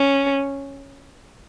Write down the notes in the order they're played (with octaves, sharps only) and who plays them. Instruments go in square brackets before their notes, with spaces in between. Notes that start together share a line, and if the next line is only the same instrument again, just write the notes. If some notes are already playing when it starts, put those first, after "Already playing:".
Already playing: [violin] C#4